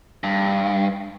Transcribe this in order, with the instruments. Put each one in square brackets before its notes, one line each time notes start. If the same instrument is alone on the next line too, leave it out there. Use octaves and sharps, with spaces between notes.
[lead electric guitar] G2